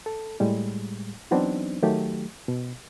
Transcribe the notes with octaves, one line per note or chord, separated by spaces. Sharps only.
A4
A2 G3 G#3
E3 F#3 B3 C4 D4 D#4
D#3 F#3 A3 G4
B2